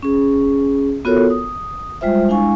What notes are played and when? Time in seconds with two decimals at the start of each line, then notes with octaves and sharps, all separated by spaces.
0.03 C#4 G#4
1.05 B3 F4 F#4 A4 A#4 C#5
1.30 D#6
2.01 G3 G#3 F4 C5 E5
2.28 G#3 D4 E4 F5 G#5 C#6